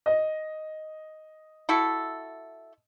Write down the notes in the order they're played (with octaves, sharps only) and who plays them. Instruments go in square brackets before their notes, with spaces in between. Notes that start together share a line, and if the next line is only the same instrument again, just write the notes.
[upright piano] D#5
[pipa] E4 F#4 A4